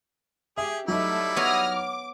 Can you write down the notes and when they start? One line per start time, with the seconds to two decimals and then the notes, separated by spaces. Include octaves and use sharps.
0.58 G4 G#4 E5
0.88 F#3 G3 A3 D#4 E4
1.36 B3 C#5 D#6 F6 A#6
1.74 D6